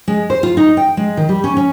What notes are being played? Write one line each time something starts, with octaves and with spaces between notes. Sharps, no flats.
G#3
C5
F4
D#4
G5
G#3
D#3
G3
C#4
C#4